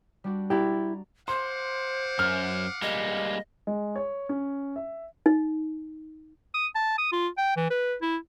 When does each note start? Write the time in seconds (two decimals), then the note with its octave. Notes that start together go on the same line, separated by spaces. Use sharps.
0.24 G3 D4 F#4
0.50 E4 G4 D5 A#5 D6
1.28 C5 F5 F#5 C6 D6
2.19 F#2 F6
2.82 G3 G#3 A#3 D#5
3.67 G#3
3.96 C#5
4.29 C#4
4.76 E5
5.26 D#4
6.54 D#6
6.75 A5
6.98 D#6
7.12 F4
7.38 G5
7.56 E3
7.70 B4
8.01 E4